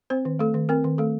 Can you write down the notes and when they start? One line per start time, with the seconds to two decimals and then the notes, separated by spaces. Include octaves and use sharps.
0.10 C4 C5
0.25 D#3
0.39 A3 A4
0.54 D#3
0.69 C4 A#4
0.84 D#3
0.98 A3 A4